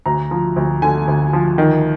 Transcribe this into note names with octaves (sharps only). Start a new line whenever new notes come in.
D2 A#5
F3
D2
D3 G#5
D2
F3
D#3